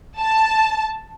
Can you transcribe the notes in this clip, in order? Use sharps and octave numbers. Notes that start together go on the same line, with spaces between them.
A5